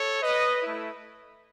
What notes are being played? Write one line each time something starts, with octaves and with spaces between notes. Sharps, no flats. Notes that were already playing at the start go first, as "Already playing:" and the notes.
Already playing: A4 C#5
B4 D#5
A3 E4